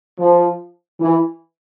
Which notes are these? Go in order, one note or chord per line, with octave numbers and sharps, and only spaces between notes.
F3
E3